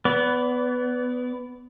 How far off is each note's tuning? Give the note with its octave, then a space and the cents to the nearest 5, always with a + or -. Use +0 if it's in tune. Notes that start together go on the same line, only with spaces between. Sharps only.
B3 +10 D5 -30